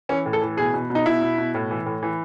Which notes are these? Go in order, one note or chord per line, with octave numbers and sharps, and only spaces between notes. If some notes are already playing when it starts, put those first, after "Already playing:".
E3 C#4
A2
A4
E3
B2 G#4
B2
B2
D#4
B2 E4
B2
B2
A2
E3
A2
E3